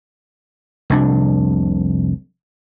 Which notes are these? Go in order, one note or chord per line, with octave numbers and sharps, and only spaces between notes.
F1 C2 D4